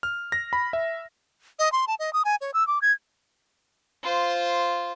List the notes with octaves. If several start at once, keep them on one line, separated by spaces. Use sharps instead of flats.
F6
A#6
B5
E5
D#5
C6
A5
D#5
D#6
G#5
C#5
E6
D6
G#6
F4 C5